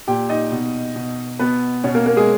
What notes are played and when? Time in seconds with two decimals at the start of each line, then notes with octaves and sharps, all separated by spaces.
0.07 A#2 G4 G5
0.30 D#4 D#5
0.52 B2
0.96 B2
1.39 B2 B3 B4
1.84 B2 C#4 C#5
1.95 A#3 A#4
2.06 A#3 A#4
2.16 G#3 G#4